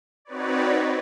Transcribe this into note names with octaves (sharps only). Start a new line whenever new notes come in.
C4 D#4 F#4 B4 C#5 D5